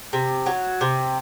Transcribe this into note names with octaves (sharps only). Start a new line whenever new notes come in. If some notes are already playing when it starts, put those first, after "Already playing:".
C3
F#3
C3